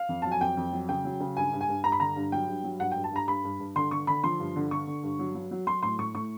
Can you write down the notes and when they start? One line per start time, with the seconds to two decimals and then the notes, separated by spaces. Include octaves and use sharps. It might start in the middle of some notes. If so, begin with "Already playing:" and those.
Already playing: F5
0.09 F2
0.22 F#3 A5
0.32 G#5
0.41 F2 G5
0.57 F2
0.73 F#3
0.89 C#3 G5
1.05 F#3
1.20 C#3
1.37 G2 G#5
1.53 G2
1.61 G#5
1.69 G2
1.84 G2 A#5
1.92 B5
2.00 D3 A#5
2.16 G2
2.32 F#3 G5
2.48 G2
2.64 F#3
2.80 G2 F#5
2.92 G5
2.96 G2
3.04 A5
3.12 G2 A#5
3.28 G2 B5
3.44 G2
3.60 G2
3.75 D3 C6
3.91 D3 C#6
4.07 D3 B5
4.24 F3 C6
4.40 G2
4.56 D3
4.71 D3 C#6
4.87 D3
5.03 G2
5.19 F#3
5.35 F#3
5.51 F#3
5.67 F#3 C6
5.83 A2 C6
5.99 A2 C#6
6.15 A2 C#6